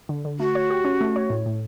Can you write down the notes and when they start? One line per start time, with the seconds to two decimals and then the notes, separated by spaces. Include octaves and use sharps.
0.09 D3
0.25 D3
0.39 A3 F#4
0.55 C#5
0.70 G4
0.85 C#4
1.01 A3
1.16 C#5
1.30 A2
1.46 A2